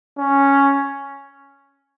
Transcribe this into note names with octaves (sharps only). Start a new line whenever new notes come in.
C#4